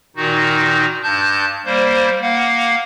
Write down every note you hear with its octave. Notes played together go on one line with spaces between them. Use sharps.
A#2 D#3 D#4 F#4
G2 A5 G6
G3 A#3 C5
A#3 F5 F#5